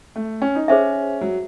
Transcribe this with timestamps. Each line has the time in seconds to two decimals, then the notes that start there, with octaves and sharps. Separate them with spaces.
0.16 A3
0.42 C#4
0.55 D#4
0.68 C#4 G#4 C5 E5
1.21 F#3